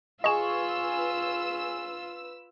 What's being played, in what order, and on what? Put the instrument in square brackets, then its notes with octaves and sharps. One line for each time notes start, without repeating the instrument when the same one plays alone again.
[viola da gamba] F4 [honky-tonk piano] G#4 C#6 [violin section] B4 E6 [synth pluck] D#5 E7